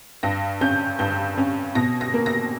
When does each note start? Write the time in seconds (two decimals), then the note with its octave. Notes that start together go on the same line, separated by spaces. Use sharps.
0.23 G2 A#6
0.61 C#4 G6
0.99 G2 G6
1.38 C#4
1.75 B2 A#6
2.01 A#6
2.14 A#3
2.26 A#6